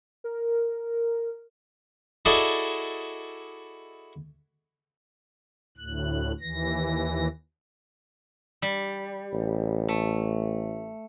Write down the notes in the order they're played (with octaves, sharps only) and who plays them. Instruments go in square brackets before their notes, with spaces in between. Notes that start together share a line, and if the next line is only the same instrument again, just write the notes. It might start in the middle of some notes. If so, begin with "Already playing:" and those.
[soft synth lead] A#4
[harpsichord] E4 F#4 G#4 A4 D5 D#5
[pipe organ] D2 A2 F#6
D#2 E3 A#6
[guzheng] G3
[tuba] A1
[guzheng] A3